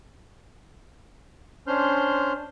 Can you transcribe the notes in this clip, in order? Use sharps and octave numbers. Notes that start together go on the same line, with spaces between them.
C#4 D4 C5 C6 F6 G6